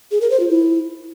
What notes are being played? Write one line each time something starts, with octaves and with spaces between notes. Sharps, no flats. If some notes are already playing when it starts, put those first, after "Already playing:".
G#4
A#4
C5
F4
E4